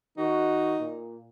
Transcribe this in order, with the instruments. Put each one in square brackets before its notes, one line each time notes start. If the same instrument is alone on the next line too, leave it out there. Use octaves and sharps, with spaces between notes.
[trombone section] D#3 F#4 [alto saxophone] D#4
[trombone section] A#2